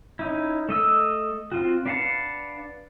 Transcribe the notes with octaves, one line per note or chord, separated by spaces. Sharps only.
C#4 D#4 E4
A3 D#5 E6
C4 F4 F#4
D4 B4 F5 F#5 A5